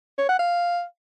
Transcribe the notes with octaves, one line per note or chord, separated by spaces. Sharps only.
C#5
F#5
F5